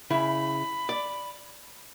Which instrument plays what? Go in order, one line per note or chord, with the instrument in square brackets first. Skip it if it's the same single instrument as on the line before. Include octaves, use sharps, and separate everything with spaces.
[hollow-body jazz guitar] C#3 E4 [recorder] B5
[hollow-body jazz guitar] D5